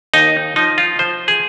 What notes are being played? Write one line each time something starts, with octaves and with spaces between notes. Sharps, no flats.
D#2 D#4
F3 D#4
F4
F3 C5
G#4